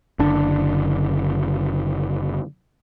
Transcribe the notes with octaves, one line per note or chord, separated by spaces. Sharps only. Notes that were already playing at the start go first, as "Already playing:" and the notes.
F#1 D3 D4